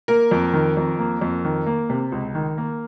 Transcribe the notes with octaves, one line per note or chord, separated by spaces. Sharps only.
A#3 A#4
F2
D#3
F2
A#3
F2
D#3
A#3
C3
C#2
D#3
A#3